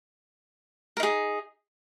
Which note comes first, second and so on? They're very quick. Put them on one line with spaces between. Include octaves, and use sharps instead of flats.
A#4 D#4 G#4